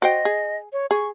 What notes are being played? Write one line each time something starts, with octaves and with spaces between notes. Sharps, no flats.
F#4 C5 D#5 G5
G#4
C#5
G#4 C#6